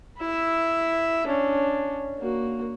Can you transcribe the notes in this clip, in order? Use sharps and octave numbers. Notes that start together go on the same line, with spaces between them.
E4 E5
C#4 D4
A#3 F#4